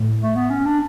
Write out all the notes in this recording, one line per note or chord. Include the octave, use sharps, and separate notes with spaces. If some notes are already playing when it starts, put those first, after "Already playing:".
Already playing: A2
A3
B3
C#4
D4